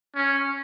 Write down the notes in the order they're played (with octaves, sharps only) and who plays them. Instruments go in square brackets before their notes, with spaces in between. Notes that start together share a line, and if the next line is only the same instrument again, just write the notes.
[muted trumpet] C#4